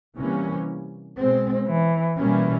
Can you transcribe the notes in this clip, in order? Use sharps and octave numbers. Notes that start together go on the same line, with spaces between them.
C3 E3 G3 A#3 C#4
B2 G#3 C4
E3
B2 E3 G3 A#3 C#4